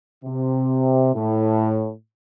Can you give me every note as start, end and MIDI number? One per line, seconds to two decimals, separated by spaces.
0.25 1.11 48
1.15 1.90 45